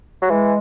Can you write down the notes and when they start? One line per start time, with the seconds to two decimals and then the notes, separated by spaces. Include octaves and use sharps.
0.22 F#3
0.29 E3 G#3